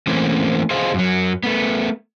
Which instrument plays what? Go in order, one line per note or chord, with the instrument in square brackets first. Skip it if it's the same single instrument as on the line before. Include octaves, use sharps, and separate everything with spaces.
[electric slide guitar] E3 A3 A#3 C4 C#4
G#4 C5 D#5 F5
F#2 F#3
A3 B3